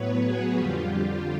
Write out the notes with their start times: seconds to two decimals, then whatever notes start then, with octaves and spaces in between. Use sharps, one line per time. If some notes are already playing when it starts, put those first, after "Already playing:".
Already playing: A2 F#3 B3 B4 C#5
0.24 F#4 G#4
0.57 F2 D3 G3 F4 G4